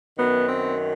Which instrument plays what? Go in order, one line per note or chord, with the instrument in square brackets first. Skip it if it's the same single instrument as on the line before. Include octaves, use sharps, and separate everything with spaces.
[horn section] F#2 D#3 F#3 B3
C4